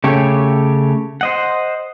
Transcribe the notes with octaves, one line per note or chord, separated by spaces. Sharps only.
C#3 A3 G4 C#5
C5 D#5 F#5